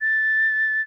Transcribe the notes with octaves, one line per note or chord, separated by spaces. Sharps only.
A6